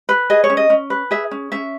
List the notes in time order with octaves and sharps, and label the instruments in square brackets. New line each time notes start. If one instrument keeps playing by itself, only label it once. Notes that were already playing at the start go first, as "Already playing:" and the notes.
[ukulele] B4
G#4 D#5
C#5
C#4
D#5
C#4
B4
G#4 E5
C#4
C#4 E5